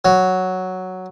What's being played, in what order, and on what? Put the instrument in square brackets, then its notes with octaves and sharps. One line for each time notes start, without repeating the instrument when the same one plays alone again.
[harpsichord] F#3